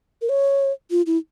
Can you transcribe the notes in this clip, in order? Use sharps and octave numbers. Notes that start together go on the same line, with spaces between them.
A#4
C#5
F4
E4